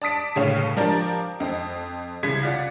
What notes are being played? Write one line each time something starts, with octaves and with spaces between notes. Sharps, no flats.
D5 A5 D#6 B6 D7
G1 A2 C#3 C#5 F5 E7
F3 D4 G4 A#4 D5
F2 C4
C2 C#3 G#6 B6
F4 D5 F#5